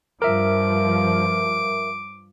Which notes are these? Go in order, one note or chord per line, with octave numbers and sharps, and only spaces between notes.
G2 F3 A#4 E5 D6